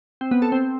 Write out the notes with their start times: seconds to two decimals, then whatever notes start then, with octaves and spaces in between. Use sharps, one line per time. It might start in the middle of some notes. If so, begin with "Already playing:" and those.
0.21 C4
0.31 B3
0.42 A4
0.52 C4